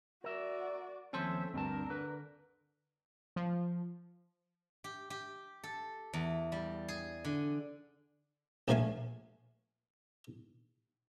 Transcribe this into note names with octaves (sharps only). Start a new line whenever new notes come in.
F#4 A#4 D5 E5
D#2 F3 A3 C4 C#4 A4 C5 E5
D2 G2 C4 D4 A#4 A5
D3 B4
F3
G4
G4
A4
E2
G3
G#4
D3
A#1 A#2 F3 A3 F5 G#5